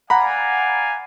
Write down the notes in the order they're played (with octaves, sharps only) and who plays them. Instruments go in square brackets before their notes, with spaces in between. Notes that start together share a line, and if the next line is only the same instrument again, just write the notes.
[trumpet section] D5 F5 G#5 [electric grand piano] F#5 A#5 B5